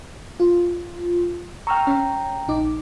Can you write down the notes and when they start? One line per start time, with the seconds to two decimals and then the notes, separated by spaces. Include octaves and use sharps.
0.40 F4
1.67 G5 A#5 C#6 E6 F6
1.87 C#4
2.48 A#1 D#4 D6